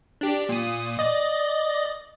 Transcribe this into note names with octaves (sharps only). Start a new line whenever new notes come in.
D4 G4
A#2 D#6
D5 D#5